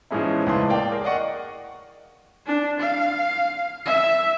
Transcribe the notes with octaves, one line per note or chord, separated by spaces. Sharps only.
G#2 E3 F3 G#3 C#4 E4
C#2 A2 E4 B4 A5 C6
A#3 D5 F5 G5
G#4 A#4
D5 D#5 F#5 C#6
D4
F5
E5